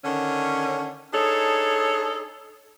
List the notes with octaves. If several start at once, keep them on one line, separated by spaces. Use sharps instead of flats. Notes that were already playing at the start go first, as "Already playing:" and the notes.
D3 D#3 C#4
D4 D#4 G#4 A4 C#5